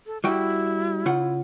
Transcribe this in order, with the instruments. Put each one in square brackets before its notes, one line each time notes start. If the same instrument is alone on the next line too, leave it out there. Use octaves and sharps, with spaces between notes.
[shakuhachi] A4
[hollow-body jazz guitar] G3 F#4 G5 [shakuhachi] E4
[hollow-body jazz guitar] C#3 F4 F#5